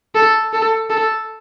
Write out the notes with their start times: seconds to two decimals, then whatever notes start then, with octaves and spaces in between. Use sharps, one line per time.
0.15 A4
0.53 A4
0.90 A4